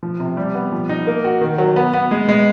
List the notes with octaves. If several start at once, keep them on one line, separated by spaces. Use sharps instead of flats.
F3
C3
G3
B3
F3
D#4
A#3
F#4
D#3
F#3
B3
B3
G#3
G#3